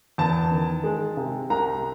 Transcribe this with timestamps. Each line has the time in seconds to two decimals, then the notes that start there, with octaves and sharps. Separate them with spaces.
0.18 E2 A5
0.52 D#3
0.84 G#3
1.17 C3
1.50 C2 A#5